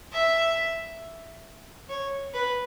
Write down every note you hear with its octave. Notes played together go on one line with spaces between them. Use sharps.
E5
C#5
B4